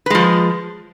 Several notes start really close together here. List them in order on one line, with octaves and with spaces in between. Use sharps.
B4 G#3 F3